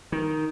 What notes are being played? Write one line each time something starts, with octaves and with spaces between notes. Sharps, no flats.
D#3